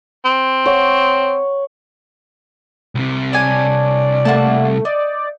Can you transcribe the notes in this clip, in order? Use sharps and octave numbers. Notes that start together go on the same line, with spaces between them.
C4
C#5 F#5
C2 C3
D4 C#5 D5 G#5
A3 A#3 F#5 A5
D#4 D5